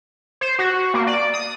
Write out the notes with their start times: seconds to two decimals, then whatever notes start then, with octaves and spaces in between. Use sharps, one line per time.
0.41 C5
0.59 F#4
0.94 A#3
1.07 D5
1.34 D#6